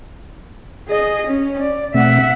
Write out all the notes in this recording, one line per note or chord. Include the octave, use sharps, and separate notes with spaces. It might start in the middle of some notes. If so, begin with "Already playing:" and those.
G#4 D#5
C#4
D5
B2 A3 C4 E5 F#5